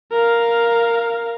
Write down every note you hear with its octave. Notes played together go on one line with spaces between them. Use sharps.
A#4 F5